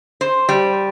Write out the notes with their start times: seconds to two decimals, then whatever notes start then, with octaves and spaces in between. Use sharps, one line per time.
0.21 C5
0.49 G3